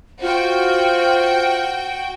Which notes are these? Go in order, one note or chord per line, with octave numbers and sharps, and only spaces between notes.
F4 F#4 C5 G5